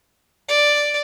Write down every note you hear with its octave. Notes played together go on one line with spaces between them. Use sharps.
D5